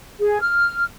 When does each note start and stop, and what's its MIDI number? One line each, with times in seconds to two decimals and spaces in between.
0.20 0.37 68
0.42 0.84 89